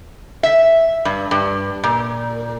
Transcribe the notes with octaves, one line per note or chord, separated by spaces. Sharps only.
E5
G2
G2
A#2